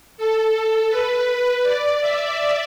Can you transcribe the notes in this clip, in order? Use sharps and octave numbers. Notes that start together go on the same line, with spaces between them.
A4
B4
D5
E5